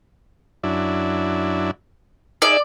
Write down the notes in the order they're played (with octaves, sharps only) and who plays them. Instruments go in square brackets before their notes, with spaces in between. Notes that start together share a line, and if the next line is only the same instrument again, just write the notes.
[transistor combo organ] F#2 D4 E4
[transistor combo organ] D#4 G#4 E5 [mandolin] D5